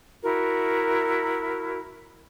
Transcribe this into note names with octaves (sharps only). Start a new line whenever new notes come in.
E4 F#4 A#4